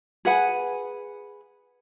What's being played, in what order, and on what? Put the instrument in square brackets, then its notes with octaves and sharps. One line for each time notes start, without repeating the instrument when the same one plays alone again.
[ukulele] G#4 B4 F#5 G#5